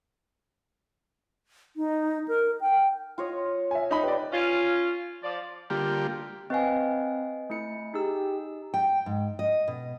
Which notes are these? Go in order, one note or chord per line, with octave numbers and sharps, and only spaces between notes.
D#4
A#4
G5
F4 C#5 D#5
E5 G#5
D#4 B5
G4 B4 D5
C#4 F4
F3 D5
D3 G3 A#3 F4 G4
C4 B4 D#5 F5 G#5
A3 E4 C#7
D#4 G4 G#4 E6
G5
G#2
D#5
B2